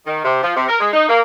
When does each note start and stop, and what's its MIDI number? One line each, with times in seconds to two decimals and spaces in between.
0.07 0.23 51
0.24 0.41 48
0.43 0.55 53
0.56 0.66 48
0.68 0.76 70
0.80 0.89 56
0.93 1.05 63
1.09 1.20 58